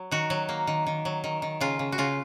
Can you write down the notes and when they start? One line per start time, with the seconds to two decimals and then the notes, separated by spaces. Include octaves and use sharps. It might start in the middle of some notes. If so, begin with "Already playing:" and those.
Already playing: F#3
0.11 D#3 F#4
0.30 F#3
0.49 A#3
0.67 D#3
0.87 D#3
1.05 F#3
1.24 D#3
1.42 D#3
1.60 C#3 F4
1.79 C#3
1.92 F#4
1.98 C#3 F4